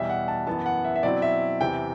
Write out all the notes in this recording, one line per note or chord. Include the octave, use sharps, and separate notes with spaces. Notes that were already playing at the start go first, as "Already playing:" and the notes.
Already playing: E2 B2 G3 E5
F#5
A5
F#2 E3 B3 A5
F#5
E5
E5
B2 F#3 C4 E4 D5
E5
E2 C3 E3 G5